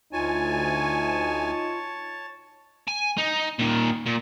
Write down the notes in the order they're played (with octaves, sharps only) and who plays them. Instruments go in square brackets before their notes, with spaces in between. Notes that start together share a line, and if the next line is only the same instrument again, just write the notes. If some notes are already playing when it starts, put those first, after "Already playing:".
[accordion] D2 G#5 [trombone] D#4 [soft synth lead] F4 [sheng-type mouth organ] C#5 A5
[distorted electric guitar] G#5
D#4
A#2 D#3
A#2